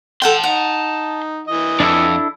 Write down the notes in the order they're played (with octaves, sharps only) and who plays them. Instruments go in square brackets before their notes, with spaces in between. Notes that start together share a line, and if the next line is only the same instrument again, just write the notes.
[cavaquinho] A4 F#5 G5 [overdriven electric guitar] A5 C6
[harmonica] D#4 [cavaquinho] F#5
[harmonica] E3 D#5
[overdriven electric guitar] F2 [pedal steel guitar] D4 E4 A4